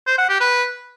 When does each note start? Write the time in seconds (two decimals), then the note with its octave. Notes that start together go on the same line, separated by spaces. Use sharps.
0.07 C5
0.18 F#5
0.29 G4
0.40 B4